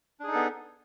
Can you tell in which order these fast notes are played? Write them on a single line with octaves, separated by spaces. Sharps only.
D4 G#4 D#4 A4 B3